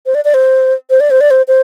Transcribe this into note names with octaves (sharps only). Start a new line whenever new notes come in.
C5
D5
D5
C5
C5
D5
C5
D5
C5
C5